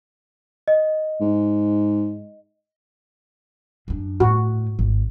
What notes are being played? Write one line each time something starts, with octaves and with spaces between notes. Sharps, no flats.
D#5
G#2
F#2 D4
A2 F#4
G#1